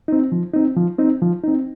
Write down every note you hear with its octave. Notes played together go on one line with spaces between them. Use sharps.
C4 D#4
F3
C4 D#4
F3
C4 D#4
F3
C4 D#4